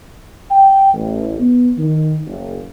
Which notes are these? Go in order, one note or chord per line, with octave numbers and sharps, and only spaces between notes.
G5
A1
B3
D#3
F#1